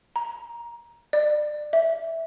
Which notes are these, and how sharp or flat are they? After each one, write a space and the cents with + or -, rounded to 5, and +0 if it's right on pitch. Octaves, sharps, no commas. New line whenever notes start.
A#5 +15
D5 +25
E5 +0